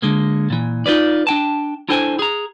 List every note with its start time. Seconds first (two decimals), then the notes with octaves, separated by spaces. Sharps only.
0.02 D3 G#3 A#3
0.50 A#2 E3
0.86 D#4 F4 B4 D5
1.27 D4 G5 A5
1.89 D4 E4 A4 C5 G5 G#5
2.19 G#4 A#5